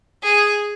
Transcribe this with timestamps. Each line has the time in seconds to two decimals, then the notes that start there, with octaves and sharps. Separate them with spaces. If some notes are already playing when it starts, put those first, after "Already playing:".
0.24 G#4